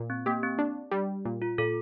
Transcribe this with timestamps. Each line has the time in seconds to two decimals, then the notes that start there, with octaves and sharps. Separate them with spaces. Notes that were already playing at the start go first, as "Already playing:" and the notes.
Already playing: A#2
0.10 C4
0.26 A#3 G4
0.43 C4
0.59 D4
0.91 G3
1.25 A#2
1.42 F4
1.58 A#2 A4